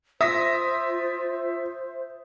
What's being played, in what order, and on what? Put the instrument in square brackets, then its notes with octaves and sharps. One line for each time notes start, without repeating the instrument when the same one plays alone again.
[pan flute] F4 [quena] C5 [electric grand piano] E5 [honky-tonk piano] D#6 A#6 B6